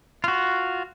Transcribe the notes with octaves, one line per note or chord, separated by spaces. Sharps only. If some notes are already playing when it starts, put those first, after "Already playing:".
F4 F#4